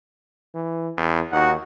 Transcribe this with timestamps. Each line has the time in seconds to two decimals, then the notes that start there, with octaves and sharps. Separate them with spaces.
0.55 E3
0.97 E2
1.32 D#2 D#4 F#4 F#5